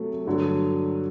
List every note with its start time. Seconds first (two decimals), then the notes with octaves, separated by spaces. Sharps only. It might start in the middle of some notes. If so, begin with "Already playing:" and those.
Already playing: C3 F#3 A3
0.26 G2 D3 F#3